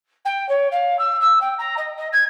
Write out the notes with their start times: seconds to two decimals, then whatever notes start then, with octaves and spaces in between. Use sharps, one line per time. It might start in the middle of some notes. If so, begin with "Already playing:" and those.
0.25 G5
0.48 C#5
0.71 F5
0.99 E6
1.21 E6
1.41 G5
1.58 A#5
1.77 D#5
1.97 D#5
2.12 G#6